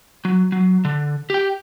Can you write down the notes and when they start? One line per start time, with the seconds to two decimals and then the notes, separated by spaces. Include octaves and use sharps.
0.25 F#3
0.52 F#3
0.85 D3
1.30 G4 G5